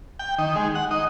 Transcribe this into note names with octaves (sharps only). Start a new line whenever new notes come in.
G5
D#3
G#3
F#5
D#4